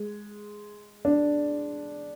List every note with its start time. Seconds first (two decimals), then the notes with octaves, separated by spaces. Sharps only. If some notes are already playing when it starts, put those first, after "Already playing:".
Already playing: G#3
1.05 D4